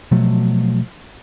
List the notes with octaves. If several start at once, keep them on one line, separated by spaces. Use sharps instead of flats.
B2 F3 F#3 A3